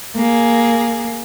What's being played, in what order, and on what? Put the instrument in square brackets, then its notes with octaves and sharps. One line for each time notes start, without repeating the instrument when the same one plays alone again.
[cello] A#3 G#4